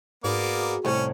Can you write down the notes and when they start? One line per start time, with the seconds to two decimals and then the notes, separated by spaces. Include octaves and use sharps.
0.24 G#2 A#3 B3 F#4 G#4 D5
0.85 C2 A2 C#4